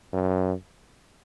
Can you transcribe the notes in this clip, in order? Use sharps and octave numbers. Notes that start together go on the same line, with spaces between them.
F#2